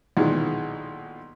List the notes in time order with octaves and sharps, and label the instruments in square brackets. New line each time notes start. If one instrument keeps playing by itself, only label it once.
[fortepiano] B1 A#2 D#3 E3 G#3